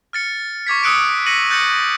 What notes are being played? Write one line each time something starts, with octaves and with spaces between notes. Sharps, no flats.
F6 A6 C#7
C#6 D6 G#6 B6
D#6 E6 F#6 C#7 D7
A#6 B6 C#7 D#7 F#7
F#6 G6 A6 A#6 C#7 F#7